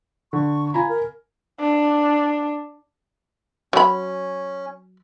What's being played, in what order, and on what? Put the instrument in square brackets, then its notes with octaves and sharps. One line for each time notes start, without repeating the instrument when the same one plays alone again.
[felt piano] D3 [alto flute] C#6
[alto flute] F4 [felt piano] G#5 A#5 B5
[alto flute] A#4
[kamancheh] D4
[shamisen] F#3 B5 [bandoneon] C#4